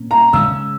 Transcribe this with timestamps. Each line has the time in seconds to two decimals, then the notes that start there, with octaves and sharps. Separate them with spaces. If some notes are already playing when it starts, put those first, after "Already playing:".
Already playing: A#2 A#3 C#4
0.11 A#5
0.33 C#3 G#3 C#4 E6